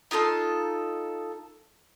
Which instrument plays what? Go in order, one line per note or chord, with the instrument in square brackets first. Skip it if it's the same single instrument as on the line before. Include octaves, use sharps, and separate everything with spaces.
[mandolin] D#4 F4 A4 C6